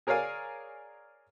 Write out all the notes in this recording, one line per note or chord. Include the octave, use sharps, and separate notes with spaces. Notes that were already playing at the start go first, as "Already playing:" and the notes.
G#4 A#4 C#5 D5 F5 G#5